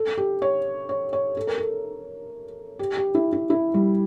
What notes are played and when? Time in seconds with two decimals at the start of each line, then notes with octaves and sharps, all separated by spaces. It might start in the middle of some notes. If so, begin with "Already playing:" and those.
Already playing: A4
0.18 G4
0.42 C#5
0.89 C#5
1.13 C#5
1.37 A4
1.47 A#4
1.58 A4
2.79 G4
2.97 G4
3.15 E4
3.33 E4
3.50 E4
3.74 G3